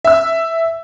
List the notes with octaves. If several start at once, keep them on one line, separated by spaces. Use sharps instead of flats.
E5 E6